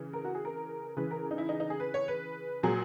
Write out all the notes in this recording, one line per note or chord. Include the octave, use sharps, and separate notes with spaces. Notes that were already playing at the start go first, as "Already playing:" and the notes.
Already playing: C#3 E3
A#4
F#4
G#4
A#4
C#3 E3 B4
A#4
D#4
E4
D#4
D#4
G#4
B4
C#5
B4
A#2 F#3 G#4